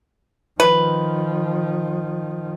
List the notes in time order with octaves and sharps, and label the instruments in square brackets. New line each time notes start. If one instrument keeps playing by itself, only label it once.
[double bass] D#3 F3 [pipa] B4